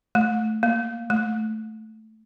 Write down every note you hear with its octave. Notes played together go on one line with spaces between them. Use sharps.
A3
A#3
A3